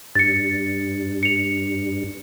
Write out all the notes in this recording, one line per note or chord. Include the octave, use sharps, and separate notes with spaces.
G2 A6 C#7
C#7 F7